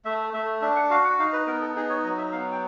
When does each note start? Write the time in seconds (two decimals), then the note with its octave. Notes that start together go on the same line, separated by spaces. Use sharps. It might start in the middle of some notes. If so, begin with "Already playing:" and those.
0.05 A3 E5
0.34 A3 E5
0.61 D4 E5
0.76 F#5
0.90 F#4 F5
1.04 F#5
1.19 D#4 F5
1.33 B4
1.47 B3 A#4
1.61 A4
1.75 D#4 G#4
1.90 C#5
2.04 F#3 D#5
2.18 E5
2.32 B3 F5
2.52 G5